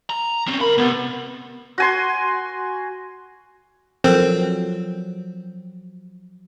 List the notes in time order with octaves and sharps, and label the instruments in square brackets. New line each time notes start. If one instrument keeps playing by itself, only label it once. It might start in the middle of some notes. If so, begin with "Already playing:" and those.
[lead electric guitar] A#5
C4 C#4
[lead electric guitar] D3 B5 [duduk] A#4
[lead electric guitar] D2 C3 [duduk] B3
[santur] F#4 G#5 C6
[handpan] F3 F#3 [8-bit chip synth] C4 [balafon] A4 A#4